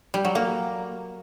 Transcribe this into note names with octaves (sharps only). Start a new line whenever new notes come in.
G3
F#3
A#3